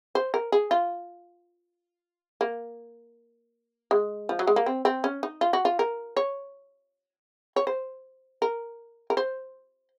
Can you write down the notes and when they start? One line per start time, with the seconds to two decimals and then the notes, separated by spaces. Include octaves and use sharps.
0.15 C5
0.34 A#4
0.52 G#4
0.71 F4
2.41 A#3
3.91 G#3
4.29 F3
4.39 F#3
4.47 G#3
4.56 A#3
4.66 C4
4.85 C4
5.04 C#4
5.23 D#4
5.41 F4
5.53 F#4
5.65 F4
5.79 A#4
6.17 C#5
7.56 C#5
7.67 C5
8.42 A#4
9.10 A#4
9.17 C5